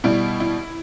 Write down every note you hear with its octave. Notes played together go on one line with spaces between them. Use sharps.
B2 G3 E4
E4